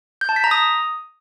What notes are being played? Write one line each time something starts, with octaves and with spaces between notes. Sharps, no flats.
G6
A5
B6
A#5
D#6